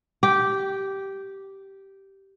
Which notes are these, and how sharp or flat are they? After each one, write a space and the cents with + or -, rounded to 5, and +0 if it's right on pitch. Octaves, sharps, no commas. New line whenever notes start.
G4 -10